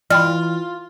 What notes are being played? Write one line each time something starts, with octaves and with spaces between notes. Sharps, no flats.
E3 F4 D5 D#5 G5 B5 F6